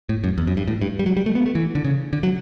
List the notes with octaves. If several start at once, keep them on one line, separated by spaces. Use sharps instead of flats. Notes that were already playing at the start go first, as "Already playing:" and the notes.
A2
F#2
E2
F#2
G2
A2
G2
G3
F#3
G3
A3
B3
A3
E3
D3
C#3
D3
F#3